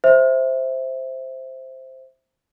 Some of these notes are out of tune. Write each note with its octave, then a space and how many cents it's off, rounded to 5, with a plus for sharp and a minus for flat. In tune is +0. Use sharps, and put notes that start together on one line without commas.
C5 +5 E5 -10